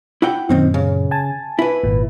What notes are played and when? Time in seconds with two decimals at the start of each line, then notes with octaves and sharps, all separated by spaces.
0.22 E4 F#5 G5
0.49 F#2 A#2 D#3 C4 D#4
0.74 C#3
1.11 G#5 A5
1.59 E4 B4
1.83 G#1 A#2